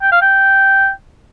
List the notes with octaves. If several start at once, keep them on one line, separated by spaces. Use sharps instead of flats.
G5
F5
G5